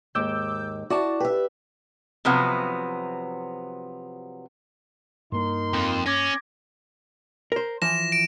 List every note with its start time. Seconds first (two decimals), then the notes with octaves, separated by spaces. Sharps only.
0.15 D#2 G#2 D6 E6 G6
0.90 E4 F#4 D5 A5
1.20 G4 B4 E5
2.25 C3 F3 F#3 B3
5.32 G2 A#3 D#4 A#4 C6
5.73 F2
6.06 C#4 D6 G#6 A#6
7.52 A#4 C5
7.82 E3 F3 A#6 E7
8.12 D7